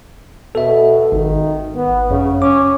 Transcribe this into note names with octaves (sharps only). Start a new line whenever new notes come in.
B2 A4 E5
G#1 D#3
B3
F#2 C#3
C#4 D6